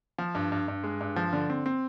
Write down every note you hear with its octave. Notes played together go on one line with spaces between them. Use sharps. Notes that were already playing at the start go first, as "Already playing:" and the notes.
F3
G2
G2
G2
G#3
G2
F3
D3
C4
C4